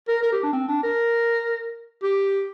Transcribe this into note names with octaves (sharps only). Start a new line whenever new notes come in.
A#4
A#4
G4
D4
C4
D4
A#4
G4